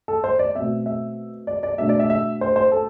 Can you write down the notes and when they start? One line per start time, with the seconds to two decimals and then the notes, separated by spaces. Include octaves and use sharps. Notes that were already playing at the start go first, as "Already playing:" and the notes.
0.08 A4
0.24 C5
0.39 D5
0.55 B2 A3 C4 E5
0.86 E5
1.47 D5
1.63 D5
1.78 B2 A3 D4 E5
1.89 D5
1.99 E5
2.10 E5
2.41 C5
2.56 C5
2.72 A4